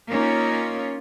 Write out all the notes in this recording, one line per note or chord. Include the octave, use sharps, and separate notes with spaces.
A#3 C#4 D#4 F4